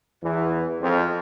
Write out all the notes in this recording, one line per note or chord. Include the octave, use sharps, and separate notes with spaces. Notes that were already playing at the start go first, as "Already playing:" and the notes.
E2 E3
F2 F3